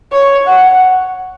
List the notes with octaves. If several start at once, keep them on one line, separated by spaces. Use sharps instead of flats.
C#5
F#5